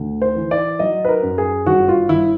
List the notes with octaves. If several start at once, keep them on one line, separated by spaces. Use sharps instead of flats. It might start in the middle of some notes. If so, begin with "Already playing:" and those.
Already playing: D2
C5
E3
D5
F#3 D#5
B4
A#4
F#2
G#4
G1 F#4
F4
G1 E4